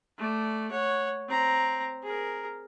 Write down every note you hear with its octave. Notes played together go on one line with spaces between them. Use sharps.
A3 D5
C#5 F#5
C4 A#5
G#4 A#4